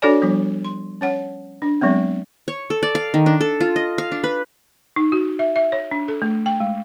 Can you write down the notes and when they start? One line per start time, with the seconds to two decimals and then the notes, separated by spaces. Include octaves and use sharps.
0.02 D4 F#4 A4 C#5 D5 G#5
0.22 F3 G3 B3
0.65 C6
1.01 C#4 C#5 F#5
1.62 D4
1.81 F#3 G#3 B3 C4
2.48 C#5
2.70 A4
2.83 D5
2.95 F5
3.14 D#3
3.26 D4
3.41 A4
3.60 F4
3.76 D#5
3.98 F5
4.12 D4
4.24 B4
4.96 D#4
5.12 F#4
5.39 E5
5.56 E5
5.72 C#5
5.91 D4
6.08 A4
6.22 A3
6.46 G5
6.60 G#3